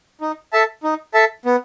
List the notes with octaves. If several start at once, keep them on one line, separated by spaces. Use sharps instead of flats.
D#4
A4 E5 A5
D#4
A4 E5 A5
B3